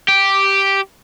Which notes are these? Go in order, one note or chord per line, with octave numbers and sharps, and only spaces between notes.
G4